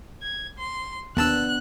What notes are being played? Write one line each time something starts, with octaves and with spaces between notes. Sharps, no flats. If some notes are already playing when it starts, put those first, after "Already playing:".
G#6
C6
D#2 B3 D4 A5 E6 F#6